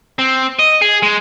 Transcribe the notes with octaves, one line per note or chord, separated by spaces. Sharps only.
C4
D#5
G#4
G#3